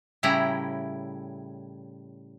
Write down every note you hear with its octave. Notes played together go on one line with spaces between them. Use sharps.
A2 C#3 G3 E4 A#5